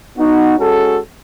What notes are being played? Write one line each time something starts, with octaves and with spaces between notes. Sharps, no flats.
B3 D#4 F#4
G#3 C#4 F#4 A4